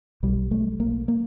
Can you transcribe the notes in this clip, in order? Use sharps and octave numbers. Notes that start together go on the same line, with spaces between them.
B1 G3
B1 A3
B1 A#3
A#3